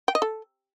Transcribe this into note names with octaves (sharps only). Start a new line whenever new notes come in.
G5
D#5
A4